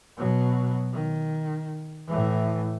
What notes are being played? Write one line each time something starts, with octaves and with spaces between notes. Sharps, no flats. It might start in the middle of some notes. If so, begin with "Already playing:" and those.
B2 F#3
D#3
A2 E3